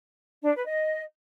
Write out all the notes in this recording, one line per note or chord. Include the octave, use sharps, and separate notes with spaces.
D4
B4
D#5